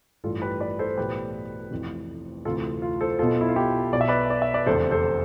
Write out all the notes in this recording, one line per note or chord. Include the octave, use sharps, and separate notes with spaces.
A1 G2 E3 F4 A4
G4 B4
B4 D5
A4 C5
B1 A2 E3 G4 B4
F1 F2 C3 E3
D2 C3 E3 F4 A4
F4
A4 C5
B1 B2 F4 A4
E4
F4
E4 G4
B1 B2 D5
E5
B4 D5
D5
E5
B4 D5
F1 E2 D3 A4 C5
A4 C5